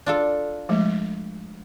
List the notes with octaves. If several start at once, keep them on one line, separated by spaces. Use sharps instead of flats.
D4 F4 A4
F3 G#3 A3